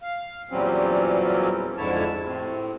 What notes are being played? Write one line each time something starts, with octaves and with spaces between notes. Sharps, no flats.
F5
E2 A#2 F#3 G3 C4 C#4
F2 G#2 D3 E4 C#5 A5
A2 C3